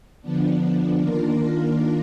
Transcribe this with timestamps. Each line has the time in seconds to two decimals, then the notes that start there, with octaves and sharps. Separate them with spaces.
0.22 D3 F3 B3 D4
0.99 D#3 A#3 D4 F4 A#4